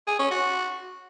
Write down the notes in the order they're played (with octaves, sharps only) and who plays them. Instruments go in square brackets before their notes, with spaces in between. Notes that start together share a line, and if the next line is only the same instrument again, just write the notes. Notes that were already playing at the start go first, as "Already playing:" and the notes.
[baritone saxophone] G#4
C#4
F#4